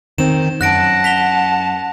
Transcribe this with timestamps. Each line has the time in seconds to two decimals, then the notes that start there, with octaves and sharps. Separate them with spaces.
0.18 D#3 C4 E7
0.61 F#2 F#5 A5 F#6 A#6 D7
1.04 B6 F7 G7